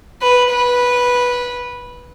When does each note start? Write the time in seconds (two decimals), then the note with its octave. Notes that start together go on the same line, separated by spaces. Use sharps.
0.22 B4
0.51 B4